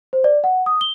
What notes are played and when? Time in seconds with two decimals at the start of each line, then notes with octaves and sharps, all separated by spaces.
0.13 C5
0.24 D5
0.44 F#5
0.66 D#6
0.81 G7